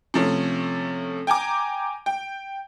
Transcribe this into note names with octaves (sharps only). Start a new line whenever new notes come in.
C3 F3 A3 C#4
G5 G#5 A#5 D6
G5